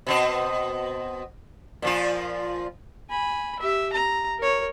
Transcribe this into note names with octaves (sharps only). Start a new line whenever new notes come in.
B2 C4 D#5
A#2 F3 F4
G#5 B5
G4 E5
A#5
A#4 C#5